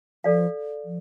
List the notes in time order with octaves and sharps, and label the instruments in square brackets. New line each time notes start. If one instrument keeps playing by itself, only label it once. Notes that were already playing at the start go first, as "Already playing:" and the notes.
[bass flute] F3 [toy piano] A4 D5 F5
[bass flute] F3